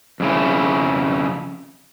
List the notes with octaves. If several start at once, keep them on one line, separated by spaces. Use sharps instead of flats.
F2 C#3 E4